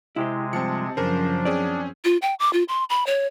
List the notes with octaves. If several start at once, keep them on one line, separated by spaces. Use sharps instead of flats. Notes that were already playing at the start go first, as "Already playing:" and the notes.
C3 G#3 E4 G4 C5
G2 F3 C4 A5 C#7
F#2 C#3 F3 D4 G#4 A#4 C5
C4 C#4 G#4 D5
F4
G5
D6
F4
C6
B5
C#5